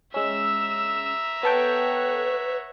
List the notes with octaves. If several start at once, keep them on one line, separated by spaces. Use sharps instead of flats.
G#3 C#4 E5 A#5 E6
B3 A4 B4 C#5 F#5 G5